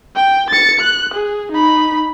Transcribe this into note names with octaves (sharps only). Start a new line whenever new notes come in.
G5
A6 C#7
F#6
G#4
D#4 B5